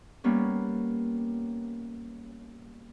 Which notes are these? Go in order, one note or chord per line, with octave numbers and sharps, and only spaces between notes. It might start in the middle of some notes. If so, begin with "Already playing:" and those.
G3 A#3 B3 C#4